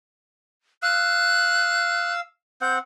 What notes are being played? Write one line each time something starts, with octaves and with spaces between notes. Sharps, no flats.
F5 E6 F#6
C4 F#5 G6